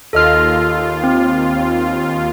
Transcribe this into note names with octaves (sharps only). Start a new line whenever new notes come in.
D#2 F4 A4 D#5 F6
C4